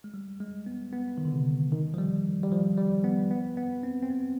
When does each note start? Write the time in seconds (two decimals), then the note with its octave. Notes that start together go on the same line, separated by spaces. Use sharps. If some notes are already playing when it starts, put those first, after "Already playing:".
0.04 G#3
0.14 G3
0.40 G#3
0.66 B3
0.93 B3
1.18 D#3
1.25 D3
1.32 C3
1.72 D#3
1.94 F3
1.98 G3
2.43 G3
2.52 F3
2.78 G3
3.04 B3
3.31 B3
3.57 B3
3.83 C4
4.03 C4
4.10 B3